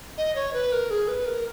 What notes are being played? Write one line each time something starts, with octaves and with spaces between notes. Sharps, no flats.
D#5
C#5
B4
A#4
G#4
B4
A#4